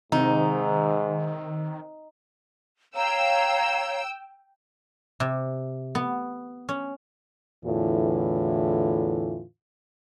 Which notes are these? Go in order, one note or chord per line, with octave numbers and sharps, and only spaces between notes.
G#2 C3 D#3 D#4
C#5 F5 G5 A#5 E6
C3
B3
C#4
E2 A2 D3 E3 F4